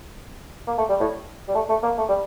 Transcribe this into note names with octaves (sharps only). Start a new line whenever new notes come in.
A#3
A3
G3
A2
G3
A3
A3
A#3
A3
G3